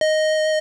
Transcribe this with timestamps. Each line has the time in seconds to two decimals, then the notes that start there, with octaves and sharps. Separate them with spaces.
0.01 D#5